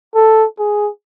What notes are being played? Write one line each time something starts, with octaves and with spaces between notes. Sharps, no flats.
A4
G#4